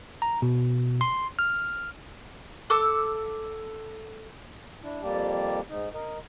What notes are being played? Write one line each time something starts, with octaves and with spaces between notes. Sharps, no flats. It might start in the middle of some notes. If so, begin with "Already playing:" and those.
A#5
B2
C6
F6
A4 D6 E6
D4 E4
F2 G3 A#3 G4 D5 A5
G#2 D#4
A#4 D#5